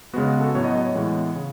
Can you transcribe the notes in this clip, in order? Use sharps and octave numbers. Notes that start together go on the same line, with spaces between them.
C#3 G#3 B3 F#4
F#4
A4
A2 F#3 B3 C#5
D#5
D#5
C#5
A2 E3 G#3 B3
C#3